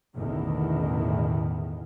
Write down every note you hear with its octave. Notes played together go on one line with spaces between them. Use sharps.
A1 E2 B2 D3 D#3